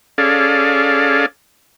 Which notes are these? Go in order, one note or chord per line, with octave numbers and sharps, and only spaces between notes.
C#4 G#4 A4 D5 F5